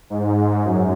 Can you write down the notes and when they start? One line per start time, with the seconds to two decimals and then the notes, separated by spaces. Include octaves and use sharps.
0.10 G#2
0.65 F#2